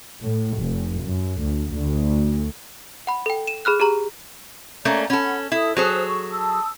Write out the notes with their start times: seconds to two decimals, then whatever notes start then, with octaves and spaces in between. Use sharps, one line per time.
0.21 A2
0.58 F1
1.02 F#2
1.42 D2
1.74 D2
3.07 F#5 B5
3.26 A4 G5
3.47 D#7 E7
3.65 G#4 B5 F6 F#6
3.80 G4 G#4 A#5 F#7
4.85 A3 A#3 C#4 D5 A#5
5.10 C#4 A4 F#5 B5
5.52 E4 A4 E5 D#6
5.77 F#3 G#4 A4 C5 D#6 F#6
6.06 C#6
6.31 A5 D#6 E6